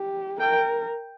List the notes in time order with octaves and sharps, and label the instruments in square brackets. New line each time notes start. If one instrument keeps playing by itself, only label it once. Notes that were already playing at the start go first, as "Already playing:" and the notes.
Already playing: [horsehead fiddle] G4
[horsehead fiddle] A#4 [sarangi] G5